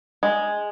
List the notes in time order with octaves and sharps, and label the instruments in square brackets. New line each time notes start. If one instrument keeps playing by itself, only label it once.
[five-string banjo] G#3